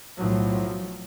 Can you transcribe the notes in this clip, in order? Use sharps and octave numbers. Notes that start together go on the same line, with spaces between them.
B1 A2 F3 F#3